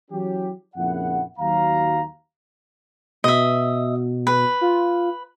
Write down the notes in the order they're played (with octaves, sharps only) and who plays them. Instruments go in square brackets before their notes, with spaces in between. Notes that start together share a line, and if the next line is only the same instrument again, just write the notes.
[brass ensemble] E3 F#3 C#4 G4
A#1 F2 C#3 A#3 E4 F#5
D#2 F#3 F5 A#5
[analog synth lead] B2 [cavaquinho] D#5 E5
[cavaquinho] B4
[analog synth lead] F4